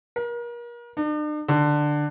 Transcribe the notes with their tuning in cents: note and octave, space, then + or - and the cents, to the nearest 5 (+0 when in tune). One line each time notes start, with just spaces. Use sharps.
A#4 +35
D4 +45
D3 +10